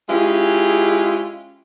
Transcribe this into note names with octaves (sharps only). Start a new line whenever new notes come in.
G#3 C#4 E4 F4 G4 G#4